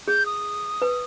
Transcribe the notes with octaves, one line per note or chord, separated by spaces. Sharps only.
G#4 G6
D#6
B4